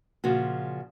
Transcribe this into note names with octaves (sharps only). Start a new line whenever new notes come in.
A#2 C#3 F3 F#4